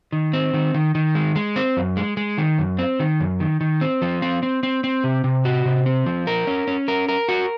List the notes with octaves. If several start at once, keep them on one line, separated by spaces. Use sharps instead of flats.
D#3
C4
D#3
D#3
D#3
G#3
G#3
C4
F#2
G#3
G#3
D#3
F#2
C4
D#3
F#2
D#3
D#3
C4
F3
C4
C4
C4
C4
C3
C3
F#4
C3
C4
F3
A#4
C#4
C#4
A#4
A#4
F#4